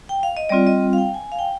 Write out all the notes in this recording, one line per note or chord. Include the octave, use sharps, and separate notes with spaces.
G5
F5
D#5
G3 C4 F4 D5
D#5
F5
G5
G#5
F5
G5